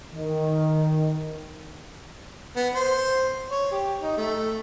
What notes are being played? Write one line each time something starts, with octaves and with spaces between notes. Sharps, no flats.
D#3
B3
C5
C#5
G4
D#4
A3